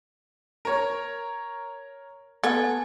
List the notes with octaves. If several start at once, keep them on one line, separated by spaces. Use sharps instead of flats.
A#4 C#5
B3 A4 G#5